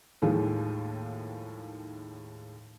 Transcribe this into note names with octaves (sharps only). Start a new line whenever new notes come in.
D#2 A2 D#3 F3 G#3